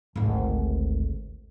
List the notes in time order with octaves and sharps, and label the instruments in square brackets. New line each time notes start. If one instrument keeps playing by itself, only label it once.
[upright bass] G#1 D2